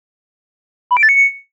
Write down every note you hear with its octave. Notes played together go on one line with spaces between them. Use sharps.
B5
D7
A6
C#7